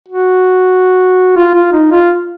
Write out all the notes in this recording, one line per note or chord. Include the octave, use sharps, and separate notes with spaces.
F#4
F4
F4
D#4
F4